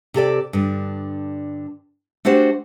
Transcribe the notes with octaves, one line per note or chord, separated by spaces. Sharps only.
C3 G4 A4 D5
G2 D3
A3 D4 F#4 G4 C5 F#5